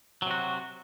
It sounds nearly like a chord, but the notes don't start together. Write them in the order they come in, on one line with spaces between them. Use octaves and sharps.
F#3 C3 F#4